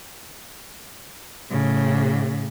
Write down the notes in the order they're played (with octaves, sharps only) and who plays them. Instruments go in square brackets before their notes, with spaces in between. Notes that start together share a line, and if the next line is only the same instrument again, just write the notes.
[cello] A2 C#3